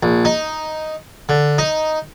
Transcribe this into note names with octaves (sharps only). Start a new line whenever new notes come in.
A#1
D#4
D3
D#4